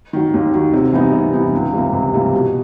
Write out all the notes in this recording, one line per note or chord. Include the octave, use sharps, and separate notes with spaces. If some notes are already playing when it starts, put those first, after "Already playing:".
D#3 F#3
D#2
D#3 F#3
C3
E3 G3 B3 D#4
C3
E3 G3 B3 D#4
C#2
C3 E3 G3 A#3
C#2
C3 E3 G3 A#3
B2